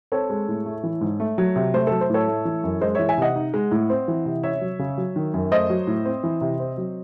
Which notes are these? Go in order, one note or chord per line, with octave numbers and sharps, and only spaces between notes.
C4 A4 C#5
G#3
A2
A3
E3
G#2
A3
F#3
C3
A3 C5
F#3 A4
C5
A2 A4 C#5
A3
E3
F#2
G#3 C5 D#5
E3 C#5 E5
E5 G#5
C3 D#5 F#5
D#4
G#3
A2
C4
E3
C3
C#4 C#5 E5
F#3
C#3
F#3
D#3
F#2
A3 C5 D#5
F#3
A2
C4
E3
C3
C4
F#3